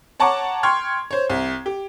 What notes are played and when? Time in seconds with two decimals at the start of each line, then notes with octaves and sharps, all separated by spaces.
0.20 C#5 F#5 A5 A#5 C#6 D6
0.63 G5 C6 C#6 F6 G#6
1.11 C5 C#5
1.30 C2
1.66 G4